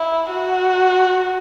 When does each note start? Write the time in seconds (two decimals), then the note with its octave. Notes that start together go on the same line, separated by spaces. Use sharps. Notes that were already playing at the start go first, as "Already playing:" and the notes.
Already playing: E4
0.30 F#4